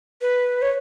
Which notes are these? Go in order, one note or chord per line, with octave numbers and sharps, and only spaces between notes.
B4
C#5